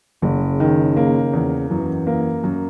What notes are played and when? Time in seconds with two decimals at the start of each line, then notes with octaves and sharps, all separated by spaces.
0.22 F#1 C#3
0.60 D#3
0.97 A#3
1.33 E2
1.70 F#2 E3
2.07 A#3
2.44 F#2